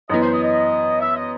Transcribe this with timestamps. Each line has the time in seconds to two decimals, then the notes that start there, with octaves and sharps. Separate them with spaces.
0.09 F#2 E3 B3 D#5
0.22 C5
0.33 D#5
0.43 D#5
1.01 E5
1.16 D#5